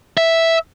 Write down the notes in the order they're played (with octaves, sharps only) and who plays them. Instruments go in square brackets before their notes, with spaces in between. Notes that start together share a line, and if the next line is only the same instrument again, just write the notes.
[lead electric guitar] E5